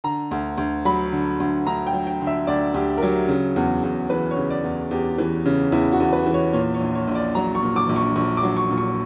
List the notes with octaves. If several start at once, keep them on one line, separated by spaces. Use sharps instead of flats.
D3 A#5
D2
D2
F#3 B5
D3
D2
D2 A#5
G5
F#3
G5
D3
E5
D2 D5
D2 G4
A#4
F#3 G4
C#3
E2
E2
E3 B4
C#5
C#3
D5
E2
E2 G4
E3
C#3
E2 E4
F#4
E2
B4
E3
C#5
A#2 C#5
C#5
A#1
C#5
A#1
D5
F#3 A#5
C#6
A#2
D6
A#1
C#6
A#1 C#6
D6
F#3
C#6
A#2
C#6